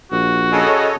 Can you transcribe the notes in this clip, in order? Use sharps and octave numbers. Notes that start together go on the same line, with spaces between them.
A#1 F#4
C#3 A4 C#5 D#5